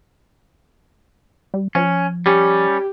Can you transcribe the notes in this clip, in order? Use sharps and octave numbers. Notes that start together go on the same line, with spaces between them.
G3
F3 C#4
G3 C#4 G4